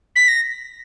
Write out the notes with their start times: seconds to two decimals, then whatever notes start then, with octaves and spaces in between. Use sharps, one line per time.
0.16 B6
0.28 A#6